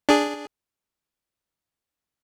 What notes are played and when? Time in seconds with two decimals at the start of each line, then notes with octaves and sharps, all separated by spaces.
0.09 D4 G#4